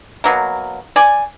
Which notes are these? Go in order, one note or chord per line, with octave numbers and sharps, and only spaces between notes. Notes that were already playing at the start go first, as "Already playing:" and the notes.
B2 F#3 A#3
D5 G#5